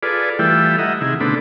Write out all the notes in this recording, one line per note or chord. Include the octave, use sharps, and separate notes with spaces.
F4 G#4 A4 B4 D5
E3 G3 A3 E4 F4 G5
D#5 E5 F#5 A#5
C3 D#3 E4 G#4
B2 D3 A3 C4 D4 B5